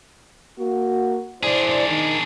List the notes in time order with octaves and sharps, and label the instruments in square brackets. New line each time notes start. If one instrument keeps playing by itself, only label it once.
[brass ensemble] A#3 F#4
[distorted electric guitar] D4 G#4 [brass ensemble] E4 C5 D5
[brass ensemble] D#3